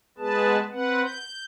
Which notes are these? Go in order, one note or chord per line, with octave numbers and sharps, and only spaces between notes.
G#3 B3 G#4 B4 A5
C4 B4 F#5
G6